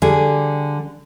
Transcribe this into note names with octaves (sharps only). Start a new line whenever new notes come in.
D3 G3 G#4